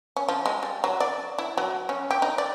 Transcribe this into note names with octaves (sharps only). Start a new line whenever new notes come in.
C#4
F3
G#3
G3
F#3
D5
E4
F#3
C#4
G4
D#4
D5